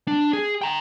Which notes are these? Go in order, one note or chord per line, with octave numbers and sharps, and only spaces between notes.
D4
G#4
G5 A#5